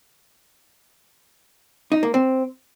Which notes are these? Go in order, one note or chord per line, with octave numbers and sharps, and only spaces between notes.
D#4
A#3
C4